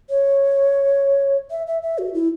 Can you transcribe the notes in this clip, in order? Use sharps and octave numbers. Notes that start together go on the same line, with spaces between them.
C#5
E5
E5
E5
F#4
E4